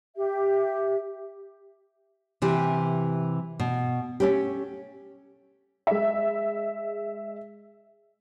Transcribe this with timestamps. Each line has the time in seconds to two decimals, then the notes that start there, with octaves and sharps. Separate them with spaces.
0.17 G4 E5
2.42 C3 E3 G4
3.60 B2
4.20 A3 C#4 G4
5.87 G#3 E5